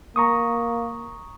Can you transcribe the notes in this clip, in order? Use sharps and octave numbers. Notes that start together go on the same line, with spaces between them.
A#3 A#5 C#6 D#6